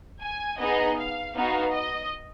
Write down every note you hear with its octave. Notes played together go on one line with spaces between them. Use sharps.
G#5
B3 D#4 G#4 D#5
F5
B3 D#4 F#4 F5
D#5